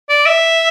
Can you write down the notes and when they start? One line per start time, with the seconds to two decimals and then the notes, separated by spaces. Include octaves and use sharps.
0.09 D5
0.26 E5